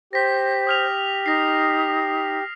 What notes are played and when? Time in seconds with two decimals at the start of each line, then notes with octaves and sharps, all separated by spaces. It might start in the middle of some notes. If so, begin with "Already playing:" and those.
0.13 G4 C5 A#6 B6
0.67 D#6 F6 F7
1.26 D#4 A#6 C7